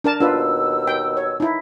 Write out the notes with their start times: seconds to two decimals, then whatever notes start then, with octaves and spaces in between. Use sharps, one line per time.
0.04 D4 A#4 A5
0.20 D#2 B2 D4 F4 B4 E6
0.87 G5
1.17 C#5
1.40 D#4 E4